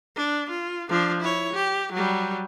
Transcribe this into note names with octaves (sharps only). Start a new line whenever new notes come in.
D4
F4
F3 D4
E4 C#5
G4
F#3 G3